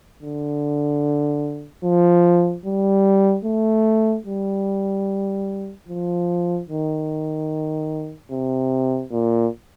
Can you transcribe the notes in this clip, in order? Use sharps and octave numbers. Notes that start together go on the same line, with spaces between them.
D3
F3
G3
A3
G3
F3
D#3
C3
A#2